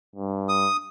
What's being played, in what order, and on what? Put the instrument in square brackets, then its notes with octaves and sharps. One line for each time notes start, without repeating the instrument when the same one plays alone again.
[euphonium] G2
[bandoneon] D#6